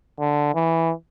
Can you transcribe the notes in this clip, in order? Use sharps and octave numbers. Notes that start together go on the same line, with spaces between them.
D3
E3